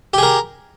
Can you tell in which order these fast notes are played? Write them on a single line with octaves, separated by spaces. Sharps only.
G4 G#4 A#4